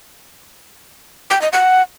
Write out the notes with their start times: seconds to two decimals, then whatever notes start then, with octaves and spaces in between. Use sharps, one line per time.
1.30 G5
1.41 D#5
1.53 F#5